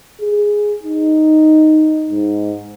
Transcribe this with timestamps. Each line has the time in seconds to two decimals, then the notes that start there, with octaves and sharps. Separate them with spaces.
0.21 G#4
0.83 D#4
2.10 G#2